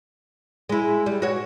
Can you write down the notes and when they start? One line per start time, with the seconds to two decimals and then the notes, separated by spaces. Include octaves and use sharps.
0.69 G#3 E4
1.06 G3
1.22 F#4 C#5